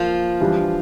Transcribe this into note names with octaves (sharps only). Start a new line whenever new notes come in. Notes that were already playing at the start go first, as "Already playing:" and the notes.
Already playing: F3 A#3 F4
E3 G3 D4 G4